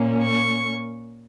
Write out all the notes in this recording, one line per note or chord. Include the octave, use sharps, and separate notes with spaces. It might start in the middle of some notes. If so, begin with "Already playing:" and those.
Already playing: A#2 A#3 C#4
C#6